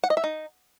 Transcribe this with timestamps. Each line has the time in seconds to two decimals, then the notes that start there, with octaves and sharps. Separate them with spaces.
0.04 F#5
0.10 D#5
0.17 E5
0.24 D#4